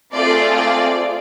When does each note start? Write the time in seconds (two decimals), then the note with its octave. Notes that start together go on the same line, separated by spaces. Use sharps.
0.13 A3 C4 F4 G#4 D5
0.57 D5